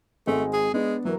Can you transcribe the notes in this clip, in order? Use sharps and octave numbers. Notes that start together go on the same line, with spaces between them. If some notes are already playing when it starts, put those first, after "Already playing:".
G#1 G#3 A3 C4
G#4
G#3 B3 D4
E3 F#3 A#4